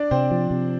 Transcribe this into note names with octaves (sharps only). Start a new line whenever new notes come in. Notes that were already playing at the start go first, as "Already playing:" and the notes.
Already playing: D4 D5
C3 C4 C5
F3
C3